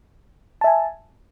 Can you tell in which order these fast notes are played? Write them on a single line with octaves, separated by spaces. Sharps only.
A5 E5 G#5